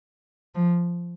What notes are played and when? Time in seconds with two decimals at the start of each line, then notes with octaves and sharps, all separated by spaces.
0.55 F3